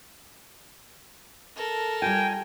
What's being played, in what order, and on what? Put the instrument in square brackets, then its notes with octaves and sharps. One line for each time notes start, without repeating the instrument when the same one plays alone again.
[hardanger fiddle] A4 A#4
[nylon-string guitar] G3 F4 [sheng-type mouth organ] G5 [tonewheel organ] G#5